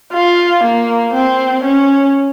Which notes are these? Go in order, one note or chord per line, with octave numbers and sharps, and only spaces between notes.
F4
A#3
C4
C#4